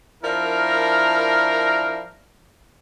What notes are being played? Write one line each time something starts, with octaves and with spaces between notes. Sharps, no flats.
F3 D4 E4 A#4